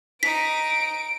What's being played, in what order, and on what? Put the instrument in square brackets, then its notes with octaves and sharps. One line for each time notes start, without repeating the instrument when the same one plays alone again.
[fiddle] D#4 [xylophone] B6 [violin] D7